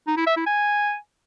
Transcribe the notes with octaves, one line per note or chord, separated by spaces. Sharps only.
D#4
E4
E5
E4
G#5